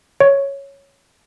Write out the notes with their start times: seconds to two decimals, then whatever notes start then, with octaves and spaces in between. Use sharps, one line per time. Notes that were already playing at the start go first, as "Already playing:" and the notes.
0.20 C#5